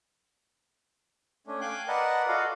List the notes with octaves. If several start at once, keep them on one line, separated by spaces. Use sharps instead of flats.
A3 C#4 D4
F5 G5 G#5 F#6 G6
A#4 B4 D5 D#5 F#5 A5
F4 F#4 A4 D5 D#5 F5